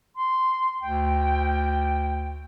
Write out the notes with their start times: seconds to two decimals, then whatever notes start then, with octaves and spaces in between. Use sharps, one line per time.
0.16 C6
0.82 D2 G5